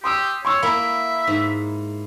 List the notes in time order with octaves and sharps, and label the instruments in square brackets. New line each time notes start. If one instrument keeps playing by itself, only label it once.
[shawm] G4 [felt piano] C6 D#6 E6
[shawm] C#5 [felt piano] C6 C#6 E6
[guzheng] A#3 E4 [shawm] E5 [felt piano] A#5 B5
[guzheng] G#2